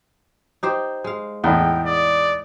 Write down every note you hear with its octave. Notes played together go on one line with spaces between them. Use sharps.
D#4 G4 C5
G#3 F5
E2 A2 D#4 G5
D5 D#6